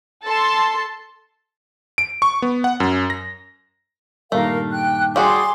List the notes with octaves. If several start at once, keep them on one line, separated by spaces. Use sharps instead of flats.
A4 A5 C6
D7
C#6
B3
F#5
F#2
A#6
G2 A#2 D#3 A3 A#4 F5
G5 F#6
G3 F#4 G#4 C6 D6